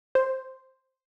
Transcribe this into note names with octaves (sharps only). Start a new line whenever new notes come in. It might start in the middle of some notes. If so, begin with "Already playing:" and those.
C5